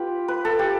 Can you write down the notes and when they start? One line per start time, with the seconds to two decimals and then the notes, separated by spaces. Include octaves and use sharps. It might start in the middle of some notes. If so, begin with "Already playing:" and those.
Already playing: F4 G4 B4
0.28 B4
0.45 A4
0.59 G4